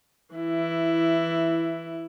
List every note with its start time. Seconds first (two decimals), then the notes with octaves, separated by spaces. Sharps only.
0.35 E3 E4